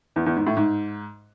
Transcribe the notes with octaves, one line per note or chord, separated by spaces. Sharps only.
E2
E2
G#2
A2
G#2